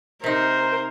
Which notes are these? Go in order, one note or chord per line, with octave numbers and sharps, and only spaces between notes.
C3 D#4 A#4 C5